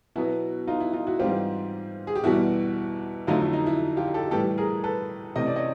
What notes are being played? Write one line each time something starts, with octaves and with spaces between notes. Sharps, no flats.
B2 F#3 B3 E4 F#4
D#4 F4
E4
D#4 F4
E4 F#4
G#2 E3 G3 C4 F4 G4
G#4
G4
E2 B2 G3 E4 F#4
F2 D3 F#3 A3 D#4 F4
E4
D#4
E4
F4 G4
G4 A4
A2 E3 G3 G4 A4
G#4 A#4
A4 B4
C3 E3 A3 C#4 D#5
D5
C#5 D#5